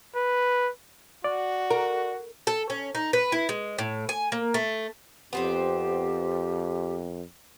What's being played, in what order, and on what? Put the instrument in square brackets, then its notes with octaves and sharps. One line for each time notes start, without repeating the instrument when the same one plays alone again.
[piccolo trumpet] B4
[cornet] F#4 [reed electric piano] D5
[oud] A#4
[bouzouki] A4
C#4
D#4
B4
E4
G#3
A2
G#5
A#3
A3
[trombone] F2 [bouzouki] B3 C4 C5 [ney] G4